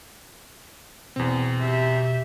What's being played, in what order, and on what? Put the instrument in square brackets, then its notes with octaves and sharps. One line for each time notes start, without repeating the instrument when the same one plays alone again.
[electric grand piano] E2 C4 [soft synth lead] B2
[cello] G4 E5